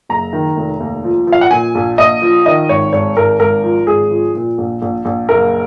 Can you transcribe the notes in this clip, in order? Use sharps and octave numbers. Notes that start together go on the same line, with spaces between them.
F#1 A#5
D#3
F1
D#2
F3
F3
F5
F#5
A#2 G#5
A#1
A#1 D#5
F3
D#3 D#5
G#1 C#5
G#1 C#5
G#1 A#4
G#1 A#4
F3
G#1 G#4
F3
A#2
A#1
A#1
A#1
F#1 A#4